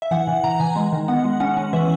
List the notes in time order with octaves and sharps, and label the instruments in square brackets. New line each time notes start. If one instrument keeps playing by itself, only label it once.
[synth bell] E5
E3 F#5
E3
E3 A#5
E3 G#5
G#3
D#3
B3 F#5
G#3
C#4 F#5
C#4
E3 E5